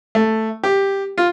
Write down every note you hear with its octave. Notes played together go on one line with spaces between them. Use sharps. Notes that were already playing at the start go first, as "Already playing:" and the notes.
A3
G4
F4